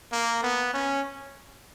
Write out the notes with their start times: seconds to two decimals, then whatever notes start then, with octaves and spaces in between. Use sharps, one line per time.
0.12 A#3
0.43 B3
0.73 C#4